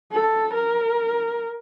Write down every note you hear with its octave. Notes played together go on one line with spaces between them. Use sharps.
A4
A#4